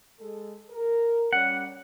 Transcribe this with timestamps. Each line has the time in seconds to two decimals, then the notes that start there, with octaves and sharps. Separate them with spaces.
0.19 G#3 A4
0.70 A#4
1.33 G3 C#4 F#5